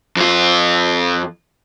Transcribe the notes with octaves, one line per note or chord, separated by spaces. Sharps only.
F2 F4